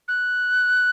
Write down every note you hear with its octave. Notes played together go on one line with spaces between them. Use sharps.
F#6